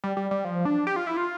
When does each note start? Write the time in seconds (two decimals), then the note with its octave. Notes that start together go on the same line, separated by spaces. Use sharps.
0.04 G3
0.17 G3
0.31 G3
0.45 F3
0.65 D4
0.87 G4
0.96 F4
1.07 E4
1.17 F4